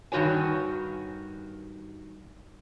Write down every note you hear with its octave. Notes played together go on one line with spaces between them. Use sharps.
G2 D#3 F3 F#4 C#5 G#5